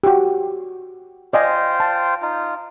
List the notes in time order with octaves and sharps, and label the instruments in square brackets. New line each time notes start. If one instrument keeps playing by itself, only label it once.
[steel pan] F#4 G4
[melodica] F4 C5 G5 [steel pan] D5 D#5 G#5
[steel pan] A5
[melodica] D#4 F4